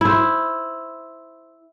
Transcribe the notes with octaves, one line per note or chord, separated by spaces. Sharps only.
E4 C5